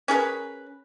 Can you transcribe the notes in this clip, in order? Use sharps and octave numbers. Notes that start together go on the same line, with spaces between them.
C#4 G#4 A#4 B4